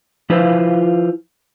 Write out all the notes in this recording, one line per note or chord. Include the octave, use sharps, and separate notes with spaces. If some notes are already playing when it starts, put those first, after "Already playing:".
F3 E4 F4 B4 C5